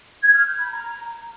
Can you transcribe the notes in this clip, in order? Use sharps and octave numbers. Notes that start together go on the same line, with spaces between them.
G#6
F6
G6
B5
A#5